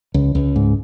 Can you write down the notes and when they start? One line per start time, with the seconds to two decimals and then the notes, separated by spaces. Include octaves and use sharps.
0.14 C#2
0.35 C#2
0.56 G#2